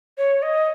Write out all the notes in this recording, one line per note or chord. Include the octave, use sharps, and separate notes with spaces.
C#5
D#5